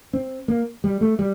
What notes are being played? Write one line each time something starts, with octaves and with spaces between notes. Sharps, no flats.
C4
A#3
G3
A3
G3